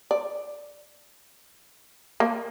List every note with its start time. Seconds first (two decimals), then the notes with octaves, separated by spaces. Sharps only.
0.11 D5
2.20 A#3